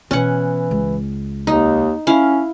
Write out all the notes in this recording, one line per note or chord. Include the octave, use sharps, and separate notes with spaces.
B2 E3 C#4 F#5
C#2
D#2 D#4
C#4 E4 F5